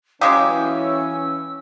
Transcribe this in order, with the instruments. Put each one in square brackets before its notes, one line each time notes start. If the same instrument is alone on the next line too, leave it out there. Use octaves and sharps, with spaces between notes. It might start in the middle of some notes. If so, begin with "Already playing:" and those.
[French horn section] E3 C#4 [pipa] F#3 G#3 G4 [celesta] F5 D#6 [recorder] E6